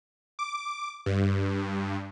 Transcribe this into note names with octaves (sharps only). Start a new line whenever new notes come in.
D6
G2